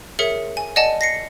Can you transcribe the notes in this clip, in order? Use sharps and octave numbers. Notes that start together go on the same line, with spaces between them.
G#4 A#4 C#5 E5 C#7 F#7
G#5
D5 D#5 F#5 G#5 A5
A#6 C7 C#7